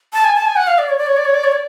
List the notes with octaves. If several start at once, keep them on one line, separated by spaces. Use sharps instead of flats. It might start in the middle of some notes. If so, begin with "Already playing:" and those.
A5
G#5
A5
G#5
F#5
F5
D5
C#5
D5
C#5
D5
C#5
D5
C#5
D5